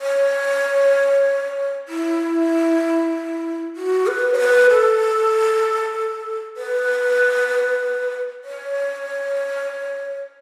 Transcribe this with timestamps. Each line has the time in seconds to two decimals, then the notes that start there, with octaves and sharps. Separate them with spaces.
0.01 C#5
1.88 E4
3.76 F#4
4.07 B4
4.34 C#5
4.39 B4
4.70 A4
6.57 B4
8.44 C#5